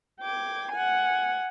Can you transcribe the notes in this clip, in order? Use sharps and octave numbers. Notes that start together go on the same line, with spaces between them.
G5 D6 G#6
F#5 G#5